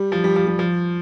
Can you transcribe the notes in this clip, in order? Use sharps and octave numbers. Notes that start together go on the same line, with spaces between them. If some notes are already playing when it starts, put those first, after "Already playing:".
Already playing: G3
F3
G3
F3
G3
F3